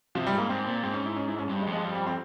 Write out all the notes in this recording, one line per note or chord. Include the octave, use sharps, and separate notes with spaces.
C3 F3
G3
G#2
A#3
G#2 C4
A#2
G#2 C4
C#4
E4
C#4
E4
C#4
G2 C4
G#3
F2
G#3
G3
G3
C4